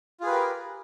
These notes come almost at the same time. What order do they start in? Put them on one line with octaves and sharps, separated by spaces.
F4 G#4 B4 G4 A#4